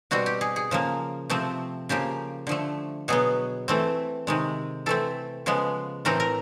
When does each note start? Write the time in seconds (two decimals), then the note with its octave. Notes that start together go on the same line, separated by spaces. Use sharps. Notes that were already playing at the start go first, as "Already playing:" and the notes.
0.11 B2 G3 C4 F#4
0.26 G4
0.41 G#4
0.56 G#4
0.71 C#3 F3 A#3
1.30 C3 F3 A3 C4
1.89 C#3 F3 A#3 G4
2.47 D3 F3 A3
3.08 B2 F#3 B3 G#4
3.68 E3 A3 C4
4.27 C3 D#3 G#3
4.86 E3 A3 C4 A4
5.46 C#3 F3 G#3 B3
6.05 A2 E3 A3 C4 A#4
6.20 A#4